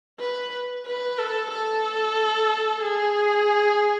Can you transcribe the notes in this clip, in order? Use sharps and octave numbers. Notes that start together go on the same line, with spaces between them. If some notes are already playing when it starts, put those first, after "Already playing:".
B4
B4
A4
A4
G#4